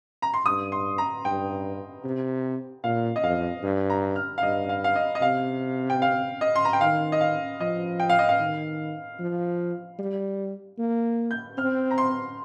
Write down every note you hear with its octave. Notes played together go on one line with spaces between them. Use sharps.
A#5
C6
G2 D#6
C6
A#5
G2 G5
C3
A#2 F5
D#5
F2 F5
G2
A#5
F6
F5
G2 D#5
F5
F5
D#5
D#5
C3 F5
G5
F5
D#5
C6
A#5
G5
D#3 F5
D#5
F5
F3 D#5
G5
F5
D#5
F5
D#3
F3
G3
A#3
G6
C4 F6
A#5
C6